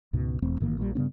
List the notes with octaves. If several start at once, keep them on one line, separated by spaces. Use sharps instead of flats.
C#2 G#2 B2
E1 E2 A3 C4
A1 G#2 D#3 A#3
A#1 A#2 D#3 G3
G2 C#3 B3 C#4